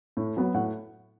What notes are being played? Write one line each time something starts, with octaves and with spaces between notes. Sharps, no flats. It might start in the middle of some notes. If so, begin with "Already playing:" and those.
A2
F#3 B3
A2 F#5